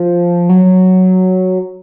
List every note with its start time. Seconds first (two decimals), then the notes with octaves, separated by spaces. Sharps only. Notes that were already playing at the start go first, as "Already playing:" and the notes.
Already playing: F3
0.50 F#3